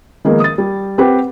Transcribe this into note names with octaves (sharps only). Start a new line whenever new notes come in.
D#3 F3 G#3 A#3 B3 D#4
D#6 A6
G3
C4 G4 B4 F#5 G5